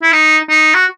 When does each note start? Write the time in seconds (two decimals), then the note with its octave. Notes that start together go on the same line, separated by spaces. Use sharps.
0.02 E4
0.12 D#4
0.49 D#4
0.74 F#4